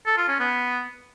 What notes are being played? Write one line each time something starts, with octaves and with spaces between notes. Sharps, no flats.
A4
F4
C#4
B3